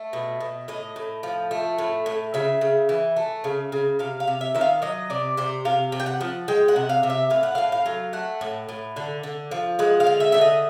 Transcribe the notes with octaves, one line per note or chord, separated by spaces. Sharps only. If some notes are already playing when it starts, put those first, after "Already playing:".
Already playing: A3
B2
B2
A2 D#5
A2
F3
A3
A2
A2
C#3 E5
C#3
E3
A3
C#3
C#3
C3 F5
F5
C3
E5
D#3 E5
F5
F#3 D#5
C3 D5
C3 C5
C3 F5
C3
G5
F#5
F3
G#3 G5
F#5
C3
F5
C3
E5
A2 F5
F#5
A2 F5
F5
F#3
A3 F#5
A2
A2
D3
D3
F3
G#3 F#5
F5
D3
E5
D3 E5
D#5